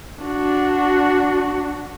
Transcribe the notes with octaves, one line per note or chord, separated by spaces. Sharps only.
D4 F#4